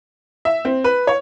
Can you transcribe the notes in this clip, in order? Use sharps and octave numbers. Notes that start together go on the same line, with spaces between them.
E5
C4
B4
C#5